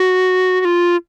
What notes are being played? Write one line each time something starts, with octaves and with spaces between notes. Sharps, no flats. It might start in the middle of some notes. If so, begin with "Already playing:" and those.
Already playing: F#4
F#4
F4